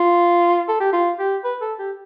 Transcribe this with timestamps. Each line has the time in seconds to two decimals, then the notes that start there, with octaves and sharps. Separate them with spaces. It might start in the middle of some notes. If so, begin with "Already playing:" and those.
Already playing: F4
0.69 A4
0.81 G4
0.93 F4
1.19 G4
1.44 B4
1.62 A4
1.79 G4